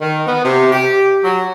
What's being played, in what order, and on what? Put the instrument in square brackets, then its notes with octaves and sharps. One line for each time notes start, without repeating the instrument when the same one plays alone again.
[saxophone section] D#3
B3
C3
G4
F#3